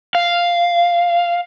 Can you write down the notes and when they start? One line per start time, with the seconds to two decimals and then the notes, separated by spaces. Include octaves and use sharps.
0.15 F5